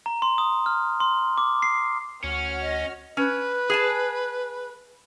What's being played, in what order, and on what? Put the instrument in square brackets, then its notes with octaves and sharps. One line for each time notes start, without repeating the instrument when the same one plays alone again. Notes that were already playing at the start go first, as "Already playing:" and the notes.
[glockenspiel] A#5
C6
D#6
F6
C6
D6
C7
[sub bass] D2 [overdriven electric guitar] C#4 [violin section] F#4 C#5 F6
[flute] D#5
[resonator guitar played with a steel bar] C#4 [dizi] B4
[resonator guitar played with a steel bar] G#4 G#5 A5